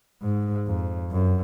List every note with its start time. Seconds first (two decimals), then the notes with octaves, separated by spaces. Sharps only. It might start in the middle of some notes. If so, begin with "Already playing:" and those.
0.22 G#2
0.67 F2
1.12 F#2